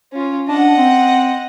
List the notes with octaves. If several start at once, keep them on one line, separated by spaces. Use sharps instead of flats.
C#4 F4
D4 D#5 F#5
C4